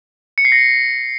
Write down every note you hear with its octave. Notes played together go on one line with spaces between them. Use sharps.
C#7
C7
A#6